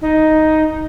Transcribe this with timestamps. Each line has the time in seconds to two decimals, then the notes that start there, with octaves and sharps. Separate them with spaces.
0.01 D#4